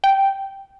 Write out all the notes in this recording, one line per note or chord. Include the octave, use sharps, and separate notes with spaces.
G5